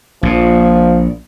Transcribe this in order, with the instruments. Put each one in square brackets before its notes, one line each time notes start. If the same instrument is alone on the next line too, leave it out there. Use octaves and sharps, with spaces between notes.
[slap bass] A#1 A#2 [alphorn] F3